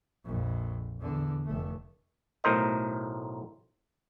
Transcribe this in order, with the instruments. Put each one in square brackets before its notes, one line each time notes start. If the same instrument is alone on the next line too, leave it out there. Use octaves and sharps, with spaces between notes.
[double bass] A#1 F2
E2 D3
F1 A3
[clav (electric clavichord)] B1 A2 A#4 C5 D#5